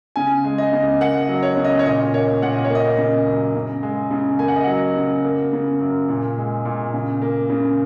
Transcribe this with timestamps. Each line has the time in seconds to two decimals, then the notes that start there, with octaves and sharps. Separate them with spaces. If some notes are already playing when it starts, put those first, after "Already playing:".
0.16 C#3 G#5
0.44 G#3
0.58 D#5
0.73 C#3
1.00 A#3 F#5
1.22 D#5
1.28 F#3
1.43 C#5
1.57 C#3
1.65 D#5
1.79 C#5
1.85 A#2 D#5
2.14 A#3 C#5
2.42 A#2 F#5
2.53 D#5
2.64 C#5
2.70 A#3
2.75 D#5
2.98 C#3
3.27 F#2
3.55 C#3
3.83 G#3
4.11 C#3
4.39 A#3 G#5
4.48 F#5
4.56 D#5
4.64 F#3 F#5
4.97 C#3
5.25 A#3
5.53 C#3
5.80 F#2
6.09 A#2
6.38 G#3
6.65 A#2
6.94 C#3
7.22 A#3
7.50 C#3